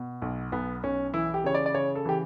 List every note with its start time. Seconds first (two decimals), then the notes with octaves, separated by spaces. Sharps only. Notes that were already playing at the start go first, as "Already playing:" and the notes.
Already playing: B2
0.22 B1
0.52 B1 B3
0.83 B1 C#4
1.14 E3 E4
1.34 G4
1.44 C#3 C#5
1.54 D5
1.66 D5
1.74 C#3 C#5
1.95 A4
2.05 E3 G4